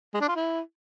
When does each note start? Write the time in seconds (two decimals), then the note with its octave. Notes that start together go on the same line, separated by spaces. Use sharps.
0.14 G#3
0.21 D4
0.28 F4
0.36 E4